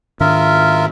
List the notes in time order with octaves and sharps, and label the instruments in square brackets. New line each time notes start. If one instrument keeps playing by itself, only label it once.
[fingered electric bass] G#2 D#3 D4 [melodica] F4 A#4 E5